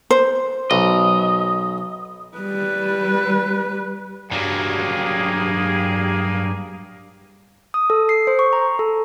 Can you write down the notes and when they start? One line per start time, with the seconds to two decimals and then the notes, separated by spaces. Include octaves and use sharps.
0.11 C5
0.71 B1 D#5
2.38 G3 B4
4.32 G2 F#3 A#3 G4 G#4
7.74 D#6
7.90 A4
8.09 C7
8.27 C5
8.39 C#6
8.53 A#5
8.79 A4